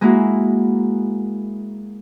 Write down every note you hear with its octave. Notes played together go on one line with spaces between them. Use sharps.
G#3 A#3 E4 F#4